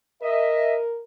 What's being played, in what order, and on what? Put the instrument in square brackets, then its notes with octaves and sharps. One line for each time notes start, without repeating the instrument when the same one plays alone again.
[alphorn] A#4 [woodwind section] D#5 E5